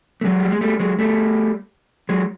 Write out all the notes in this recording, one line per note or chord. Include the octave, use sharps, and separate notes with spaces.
A3
F#3 G#3
G3
G#3
G3 A3
F#3 G#3
G3 A3
F#3 G#3